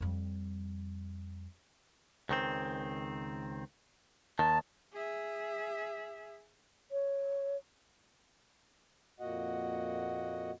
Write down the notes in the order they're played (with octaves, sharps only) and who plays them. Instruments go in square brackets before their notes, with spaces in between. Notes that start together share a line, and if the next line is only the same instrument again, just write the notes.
[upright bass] F2 G3
[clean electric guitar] C#2 D#3 C4
[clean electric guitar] D#2 D#3 [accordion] A5
[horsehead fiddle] G#4 E5
[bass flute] C#5
[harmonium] F2 A#2 A#3 F#4 D#5 F#5